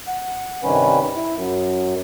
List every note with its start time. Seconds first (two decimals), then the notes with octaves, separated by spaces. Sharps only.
0.08 F#5
0.63 G2 C3 D#3 G3 C#4 B4
1.16 E4
1.35 F#2